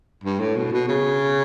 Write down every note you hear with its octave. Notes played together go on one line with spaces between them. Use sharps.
G2
A2
B2
B2
C#3